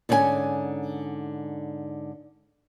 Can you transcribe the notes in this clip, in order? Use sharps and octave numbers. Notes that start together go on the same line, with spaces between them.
G#2 D3 C#4 B4 G#5